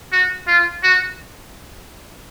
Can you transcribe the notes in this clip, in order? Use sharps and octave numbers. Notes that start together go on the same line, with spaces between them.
F#4
F4
F#4